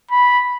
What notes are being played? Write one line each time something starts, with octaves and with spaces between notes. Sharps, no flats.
B5